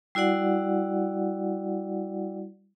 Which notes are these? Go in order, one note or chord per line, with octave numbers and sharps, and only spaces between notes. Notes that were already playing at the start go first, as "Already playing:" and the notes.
G3 E4 F#4 D5 F#5